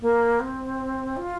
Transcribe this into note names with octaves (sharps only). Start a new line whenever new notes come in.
A#3
C4
F4